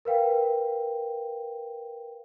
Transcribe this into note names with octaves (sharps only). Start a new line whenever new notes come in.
A#4 B4 F5 G5